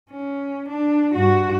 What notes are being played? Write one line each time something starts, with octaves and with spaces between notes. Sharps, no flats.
C#4
D4
G2 F#4